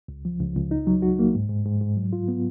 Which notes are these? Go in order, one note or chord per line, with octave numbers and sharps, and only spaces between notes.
C#2
F3
C#2
C#2
D#4
F#3
F#4
A#3
G#2
G#2
G#2
G#2
F#3
F4
B3